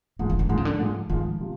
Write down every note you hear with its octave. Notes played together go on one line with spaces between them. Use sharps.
G#2 D#3 F3 G#3
E3
D#3
G#2 D3 F3 G#3
C#3
D3
G#2 F3 G#3
G#2 D#3 F3 G#3
C3 F3